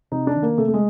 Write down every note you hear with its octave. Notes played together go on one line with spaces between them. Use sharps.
C3 D#4
D4
D#3
A#3
C3 A3
A3
G#3